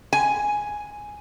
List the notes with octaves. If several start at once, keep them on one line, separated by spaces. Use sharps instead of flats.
G#5